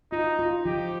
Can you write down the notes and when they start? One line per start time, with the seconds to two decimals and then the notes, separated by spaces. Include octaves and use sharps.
0.12 D#4 F4
0.39 F4
0.65 F3 G4